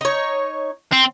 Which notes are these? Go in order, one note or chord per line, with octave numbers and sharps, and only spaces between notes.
D#4 C#5
C4